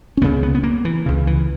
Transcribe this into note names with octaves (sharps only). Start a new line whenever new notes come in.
C#4
C#2 C#3 B3
B3
B3
A#3
E3
C#2 C#3
E3